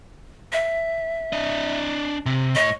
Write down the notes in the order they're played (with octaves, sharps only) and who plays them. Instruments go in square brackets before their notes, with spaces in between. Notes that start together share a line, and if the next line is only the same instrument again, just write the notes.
[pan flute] E5
[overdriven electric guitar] D4 D#5
C3
[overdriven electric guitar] A2 C#5 [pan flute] D#5